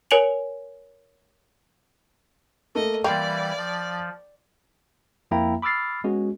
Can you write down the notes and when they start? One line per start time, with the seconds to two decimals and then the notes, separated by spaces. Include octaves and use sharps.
0.11 A#4 C#5 G#5 D7 F7 F#7
2.75 A3 A#3 D#5
3.04 E3 G3 A#3 F4 D5 F5 G5
3.57 F3
5.31 F2 F3 A#3 E4 G5 A#5
5.62 B5 D6 E6 F6 A6 C7
6.04 G#3 B3 C#4 F#4 G#4